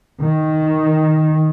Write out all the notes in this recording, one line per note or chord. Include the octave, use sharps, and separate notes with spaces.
D#3